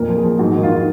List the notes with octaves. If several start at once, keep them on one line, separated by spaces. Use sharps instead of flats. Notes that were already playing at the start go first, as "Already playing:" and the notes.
Already playing: F2 A#2 A#4
F3
G#4
F3
G#2 F#4
D#3
F4
D#3
F4